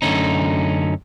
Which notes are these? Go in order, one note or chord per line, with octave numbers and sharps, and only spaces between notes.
F#2 A2 D3 A3 C#4 D#4